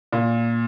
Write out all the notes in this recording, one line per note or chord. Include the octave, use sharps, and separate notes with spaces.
A#2